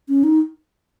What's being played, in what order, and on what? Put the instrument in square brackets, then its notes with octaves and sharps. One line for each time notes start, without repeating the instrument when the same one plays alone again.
[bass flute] C#4
D#4